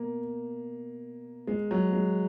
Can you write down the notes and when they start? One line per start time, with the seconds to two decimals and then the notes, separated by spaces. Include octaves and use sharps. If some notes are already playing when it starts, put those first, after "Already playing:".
Already playing: B2 A#3
1.47 G#3
1.71 F#3
1.93 G#3